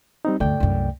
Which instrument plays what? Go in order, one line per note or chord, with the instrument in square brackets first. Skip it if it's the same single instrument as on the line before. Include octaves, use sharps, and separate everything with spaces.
[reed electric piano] G3 C4 D#4
[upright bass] D2 G2 [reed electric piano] A3 D5 G5
[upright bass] C2 F#2